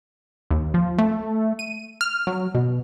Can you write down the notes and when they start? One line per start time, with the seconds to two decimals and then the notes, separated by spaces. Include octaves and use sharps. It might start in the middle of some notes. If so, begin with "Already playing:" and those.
0.51 D#2
0.74 F3
0.99 A3
1.59 D#7
2.01 F6
2.27 F#3
2.55 B2